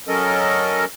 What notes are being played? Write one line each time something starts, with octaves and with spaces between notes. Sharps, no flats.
F#3 C#4 A4 A#4 D#5